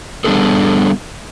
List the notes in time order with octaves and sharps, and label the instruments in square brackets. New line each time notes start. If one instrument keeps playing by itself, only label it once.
[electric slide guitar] G3 B3 C4 D4 G#4 A4